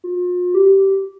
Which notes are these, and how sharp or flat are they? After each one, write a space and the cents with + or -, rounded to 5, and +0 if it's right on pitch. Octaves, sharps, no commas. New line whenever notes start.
F4 +40
G4 -15